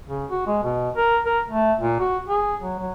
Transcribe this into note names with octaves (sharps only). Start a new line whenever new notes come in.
C#3
F#4
G#3
B2
A#4
A#4
A3
A#2
F#4
G#4
F#3
F#3